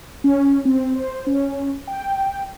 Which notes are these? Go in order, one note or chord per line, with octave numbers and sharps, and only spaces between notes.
C#4
C4
C5
C#4
G5